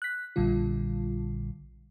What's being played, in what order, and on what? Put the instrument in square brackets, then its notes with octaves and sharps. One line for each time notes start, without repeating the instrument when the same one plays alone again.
[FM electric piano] F#6 B6
A#1 A#2 D3 G3 F4